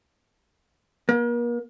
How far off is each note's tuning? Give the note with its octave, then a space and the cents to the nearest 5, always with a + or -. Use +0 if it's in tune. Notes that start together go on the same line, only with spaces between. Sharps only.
A#3 +40